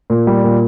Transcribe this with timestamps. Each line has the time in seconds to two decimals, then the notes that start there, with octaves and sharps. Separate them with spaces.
0.10 A#2
0.27 G3
0.44 A#2